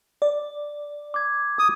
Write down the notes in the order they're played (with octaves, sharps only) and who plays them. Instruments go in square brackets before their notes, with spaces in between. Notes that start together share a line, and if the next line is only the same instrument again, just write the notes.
[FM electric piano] D5
[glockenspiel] D6 G#6
[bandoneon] D#6